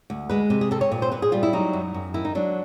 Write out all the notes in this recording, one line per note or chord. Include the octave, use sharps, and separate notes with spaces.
D2
G#3 B4
C3
G#4
C4 A4
C#5
A#2
C5
A#2 B4
G#4
G3 F4
E4
F#3 D#4
F#2
F#2
D#3 E4
D#4
F#3 D4